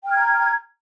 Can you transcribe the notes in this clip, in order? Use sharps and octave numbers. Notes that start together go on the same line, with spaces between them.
G5 A#5 F6 G#6